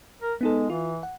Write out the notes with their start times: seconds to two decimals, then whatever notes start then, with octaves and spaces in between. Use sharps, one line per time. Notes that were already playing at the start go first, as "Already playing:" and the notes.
0.22 A#4
0.41 G#3 B3 D#4 A4
0.70 E3 F4
1.03 F#5